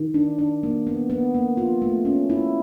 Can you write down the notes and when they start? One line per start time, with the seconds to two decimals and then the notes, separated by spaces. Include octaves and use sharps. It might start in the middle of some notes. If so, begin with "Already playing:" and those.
Already playing: D#3
0.14 D4
0.39 D4
0.63 A#3
0.87 B3
1.10 B3
1.34 A#3
1.57 F4
1.82 A3
2.05 C#4
2.30 E4